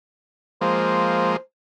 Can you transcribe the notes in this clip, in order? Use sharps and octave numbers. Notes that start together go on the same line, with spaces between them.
F3 G#3 A#3 C5